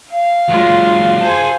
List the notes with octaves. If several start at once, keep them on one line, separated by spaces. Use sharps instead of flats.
F5
F#3 G#3 F4
G#4 C5 G#5 A5